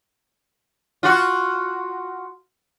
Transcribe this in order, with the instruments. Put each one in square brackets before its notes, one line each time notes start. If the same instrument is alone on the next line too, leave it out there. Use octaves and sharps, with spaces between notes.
[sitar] F4 F#4